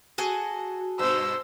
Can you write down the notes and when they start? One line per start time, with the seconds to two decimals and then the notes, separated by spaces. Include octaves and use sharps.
0.18 F#4 G#4 A4 G#5
0.99 G2 B2 C5 E6